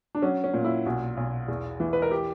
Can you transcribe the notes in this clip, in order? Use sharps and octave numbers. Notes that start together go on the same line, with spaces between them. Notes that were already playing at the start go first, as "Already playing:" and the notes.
D4
F#3 C#4
C#4
A#2
E4
B1 F#4
B1
E2
E3
B4
A#4
G4